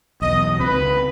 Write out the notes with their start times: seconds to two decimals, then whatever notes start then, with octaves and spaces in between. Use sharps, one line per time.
0.22 B1 E2 D#5
0.60 C#2 C4 B4